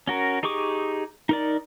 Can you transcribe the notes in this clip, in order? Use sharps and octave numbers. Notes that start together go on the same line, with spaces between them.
C#4 F#4 A#4
D#4 G4 G#4 C#6 D6
D#4 A#4 D5